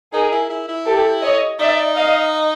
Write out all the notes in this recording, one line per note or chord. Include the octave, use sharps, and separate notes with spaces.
D#4 G#4 A#4
E4
E4
E4
G4 A4
C#5 D#5
D#4 D5 E5
D#5 F5